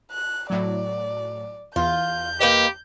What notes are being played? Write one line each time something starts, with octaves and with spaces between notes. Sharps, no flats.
F#6
A2 F#3 D5
E2 F4 G6
A#3 G4 B4 D#5